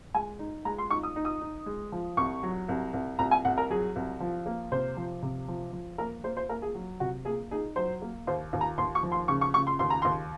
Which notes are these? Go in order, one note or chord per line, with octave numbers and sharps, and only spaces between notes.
G#3 G#5
D#4
G#3 A#5
C6
D#4 C#6
D#6
D#4
D#6
D#4
G#3
F3
C2 C#6
F#3
C2
C2
C2 A#5
G#5
C2 F#5
A#4
F#3 G#4
C2
F3
A#3
C3 C5
F3
C3
F3
F3
A#3 A#4
A#3 C5
C5
A#3 A#4
G#4
F#3
C3 F#4
A#3 G#4
D#4 G#4
F#3 C5
A#3
D#2 C5
D#2
A#5
D#2 C6
C#6
F3
C6
C#3 C#6
C#6
C#3 C#6
C6
D#2 C6
A#5
D#2 C6